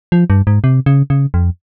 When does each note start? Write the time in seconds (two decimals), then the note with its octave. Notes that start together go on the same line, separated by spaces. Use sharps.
0.12 F3
0.30 G2
0.47 G#2
0.64 C3
0.86 C#3
1.10 C#3
1.34 F2